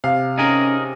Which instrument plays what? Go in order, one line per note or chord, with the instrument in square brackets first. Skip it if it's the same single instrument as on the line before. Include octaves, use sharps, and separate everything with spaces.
[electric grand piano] C3 [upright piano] F5
[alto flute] C#4 [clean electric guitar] D#4 G#4 A#4